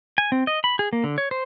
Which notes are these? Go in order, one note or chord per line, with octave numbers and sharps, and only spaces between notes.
G#5
C4
D#5
B5
G#4
A#3
D3
C#5
C5